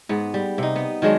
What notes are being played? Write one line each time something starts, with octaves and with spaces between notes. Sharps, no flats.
G#2 B3
G3
C3 D#4
B3
D#3 F#3 G#3 D4